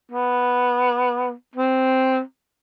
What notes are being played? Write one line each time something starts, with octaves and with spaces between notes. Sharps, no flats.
B3
C4